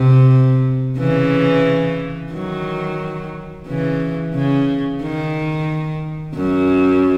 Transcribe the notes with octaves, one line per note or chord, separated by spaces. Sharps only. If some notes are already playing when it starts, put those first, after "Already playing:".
Already playing: C3
C#3 E3
D#3 F#3
C#3 E3
C#3
D#3
F#2